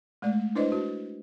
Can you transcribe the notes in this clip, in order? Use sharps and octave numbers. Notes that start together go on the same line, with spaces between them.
G#3 A3 D5
D4 E4 B4 C5 D5 D#5
F#4